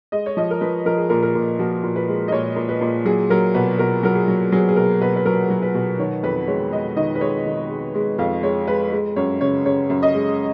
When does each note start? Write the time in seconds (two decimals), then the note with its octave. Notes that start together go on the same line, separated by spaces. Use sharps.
0.12 G#3 D#5
0.26 C#5
0.37 F3 D#5
0.51 A#4
0.61 F3 B4
0.86 F3 A#4
0.97 G#4
1.09 A#2 A#4
1.23 A#4
1.35 A#2
1.59 F3 F#4
1.83 A#2
1.96 B4
2.08 G#3
2.28 D#5
2.32 A#2 C#5
2.56 A#2
2.69 B4
2.81 A#2
3.05 F#3 G#4
3.30 F#3 A#4
3.55 B2 B4
3.79 B2 A#4
4.03 F#3 A#4
4.16 G#4
4.28 F#3
4.52 F#3 G#4
4.69 G#4
4.76 B2 A#4
5.01 B2 B4
5.16 B4
5.25 F#3 A#4
5.50 F#3
5.62 B4
5.74 B2
5.99 D#3 C#5
6.23 F2 B4
6.47 G#3 C#5
6.72 G#3 D#5
6.96 D#3 D#5
7.15 B4
7.21 G#3 C#5
7.46 D#3
7.69 G#3
7.95 G#3
8.18 F2 F5
8.43 G#3 C#5
8.67 G#3 B4
8.92 G#3
9.16 F#2 C#5
9.41 C#3 C#5
9.66 C#3 C#5
9.90 F#2
10.03 D#5
10.15 G#3